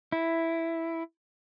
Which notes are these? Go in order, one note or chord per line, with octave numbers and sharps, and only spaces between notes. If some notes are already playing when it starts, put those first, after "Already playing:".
E4